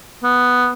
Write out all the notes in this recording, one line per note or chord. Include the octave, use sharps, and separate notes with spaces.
B3